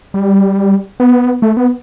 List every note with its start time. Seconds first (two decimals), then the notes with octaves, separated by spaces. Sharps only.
0.14 G3
1.00 B3
1.42 A3
1.57 B3